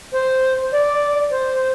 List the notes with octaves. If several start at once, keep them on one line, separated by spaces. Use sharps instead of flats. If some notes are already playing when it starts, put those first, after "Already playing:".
C5
D5
C5